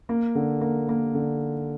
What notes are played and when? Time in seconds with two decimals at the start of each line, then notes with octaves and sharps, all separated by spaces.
0.09 A#3
0.35 D3
0.61 A#3
0.89 A#3
1.15 D3